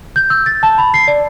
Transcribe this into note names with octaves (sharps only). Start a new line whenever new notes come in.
G6
E6
A6
A5
B5
C7
D5